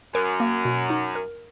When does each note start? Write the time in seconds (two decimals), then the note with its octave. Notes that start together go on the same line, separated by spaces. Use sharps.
0.14 F#2 A#4
0.40 A#3
0.65 B2
0.90 D#4
1.15 A#4